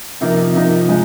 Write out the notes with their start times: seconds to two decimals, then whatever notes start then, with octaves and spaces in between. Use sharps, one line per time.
0.21 C3 F3 A#3 D#4
0.55 C3 F3 A#3 D#4
0.89 G#3 D#4